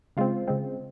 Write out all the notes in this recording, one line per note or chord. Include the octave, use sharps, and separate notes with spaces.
C#3 G#3 C4 F4
C#3 G#3 C4